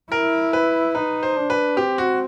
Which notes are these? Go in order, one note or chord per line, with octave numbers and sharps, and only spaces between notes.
E4 A#4
B4
D#4 B4
C5
D4
B4
C4 G4
F#4